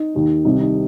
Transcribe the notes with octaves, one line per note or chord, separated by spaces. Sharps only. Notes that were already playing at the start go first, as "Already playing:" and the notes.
Already playing: D#4
D#2 D#3
C2 C3 D#3 D#4
D#4